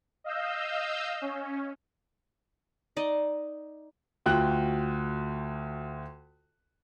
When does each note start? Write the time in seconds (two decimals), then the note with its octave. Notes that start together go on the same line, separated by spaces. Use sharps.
0.24 D#5 F5 E6 G6
1.21 C#4
2.97 D#4 D5 D#5
4.26 D2 F4 F#4 G5 F#6